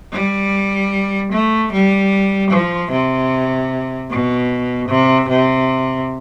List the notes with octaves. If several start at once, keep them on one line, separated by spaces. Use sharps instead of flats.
G3
A3
G3
F3
C3
B2
C3
C3